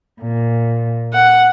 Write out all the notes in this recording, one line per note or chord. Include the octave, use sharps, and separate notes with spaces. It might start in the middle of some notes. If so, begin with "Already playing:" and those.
A#2
F#5